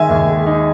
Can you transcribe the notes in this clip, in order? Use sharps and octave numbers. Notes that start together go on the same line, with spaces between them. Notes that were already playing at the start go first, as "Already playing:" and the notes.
Already playing: D#3 G#3 E5 G#5
D#2
G#3
D#4